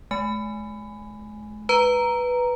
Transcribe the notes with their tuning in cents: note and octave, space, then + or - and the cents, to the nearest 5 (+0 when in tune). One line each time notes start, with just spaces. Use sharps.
G#3 +45 G#5 +0
B4 +0 A#5 +0